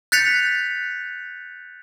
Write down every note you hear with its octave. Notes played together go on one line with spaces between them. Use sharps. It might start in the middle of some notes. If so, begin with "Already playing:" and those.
F#6 G6 A6 B6 C#7 F7